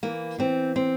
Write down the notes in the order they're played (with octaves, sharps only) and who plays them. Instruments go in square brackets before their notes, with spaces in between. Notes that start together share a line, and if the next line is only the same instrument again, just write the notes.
[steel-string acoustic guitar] E3 A#3
E3 C4
C4